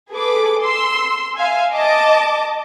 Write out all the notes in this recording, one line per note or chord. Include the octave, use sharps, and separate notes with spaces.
G#4 A4 B4 D6
C6 E6
E5 F5 G#5
D#5 A5 D6